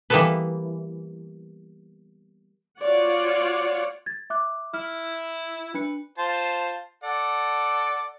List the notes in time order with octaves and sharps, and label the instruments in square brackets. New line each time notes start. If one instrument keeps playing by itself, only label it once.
[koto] E3 G3 A#3 B3 A4 B4
[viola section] F4 F#4 C#5 D5 F#5
[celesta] G#6 A6
E5 D6 F#6
[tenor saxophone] E4 [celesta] F6
[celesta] D4 C#7 [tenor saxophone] B4
[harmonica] F4 C5 A5
A4 D5 F#5